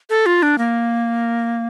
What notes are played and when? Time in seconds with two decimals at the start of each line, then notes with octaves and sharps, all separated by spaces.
0.10 A4
0.26 F4
0.43 D4
0.58 A#3